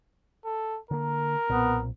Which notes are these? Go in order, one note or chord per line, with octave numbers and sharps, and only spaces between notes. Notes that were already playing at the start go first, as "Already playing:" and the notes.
A4
D3 A#3 A#4
B1 A#2 B3 C4